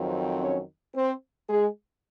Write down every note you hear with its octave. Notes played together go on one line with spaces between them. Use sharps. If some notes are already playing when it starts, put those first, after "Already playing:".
Already playing: F2 D#3 F#3 C4
C#4 C#5
C4 C5
G#3 G#4